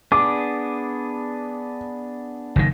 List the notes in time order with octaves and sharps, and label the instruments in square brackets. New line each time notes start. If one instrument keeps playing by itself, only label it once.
[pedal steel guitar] B3 D4 G#4 [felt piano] D6
[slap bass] F#1 A2 D#3